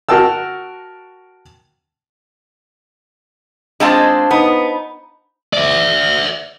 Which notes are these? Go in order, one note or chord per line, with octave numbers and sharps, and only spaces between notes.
F#4 A#4 G5 A5 E6
G#3 C4 D4 F4 C5 A5
B3 D#4
D5 E5